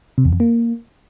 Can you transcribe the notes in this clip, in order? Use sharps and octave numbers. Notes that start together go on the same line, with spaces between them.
C3
E2
F2
A#3